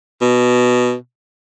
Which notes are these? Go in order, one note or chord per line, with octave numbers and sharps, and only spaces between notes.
B2